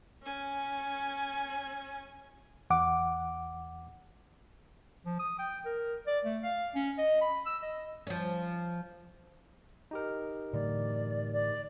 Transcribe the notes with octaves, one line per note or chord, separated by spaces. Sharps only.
C#4 G#5
E2 F#5 D6
F3
D#6
G5
A#4
D5
A3
F5
C#4
D#5
B5
E6
D#5
F3 C#4
D#4 G4 A#4
A2 D3 E3 D5
D5